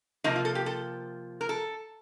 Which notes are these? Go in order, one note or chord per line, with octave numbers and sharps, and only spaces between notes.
C3 F3 A#3 D#4
F4
A4
G4
A4
A#4
A4